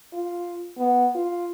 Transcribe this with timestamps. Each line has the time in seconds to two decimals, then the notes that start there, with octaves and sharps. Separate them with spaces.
0.13 F4
0.78 B3
1.15 F4